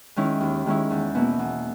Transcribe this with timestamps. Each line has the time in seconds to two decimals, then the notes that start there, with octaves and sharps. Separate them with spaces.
0.16 D#3 G#3 C#4 E4
0.40 D#2
0.66 D#3 G#3 C#4 E4
0.90 E2
1.15 B2 A#3 E4
1.39 E2